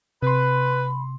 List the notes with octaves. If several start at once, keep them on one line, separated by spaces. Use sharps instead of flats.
C3 B4 B5 C6